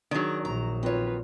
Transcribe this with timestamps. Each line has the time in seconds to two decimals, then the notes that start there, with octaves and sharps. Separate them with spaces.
0.11 D#3 F#3 D4 G#4
0.45 A#1 A#5
0.83 C4 F4 B4 C#5